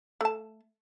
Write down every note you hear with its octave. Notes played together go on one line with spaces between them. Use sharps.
A3 A5